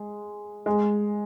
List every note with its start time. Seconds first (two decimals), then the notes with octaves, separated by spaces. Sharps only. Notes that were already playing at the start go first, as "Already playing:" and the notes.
Already playing: G#3
0.66 G#3